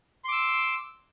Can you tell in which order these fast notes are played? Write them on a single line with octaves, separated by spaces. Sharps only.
C6 D6 E6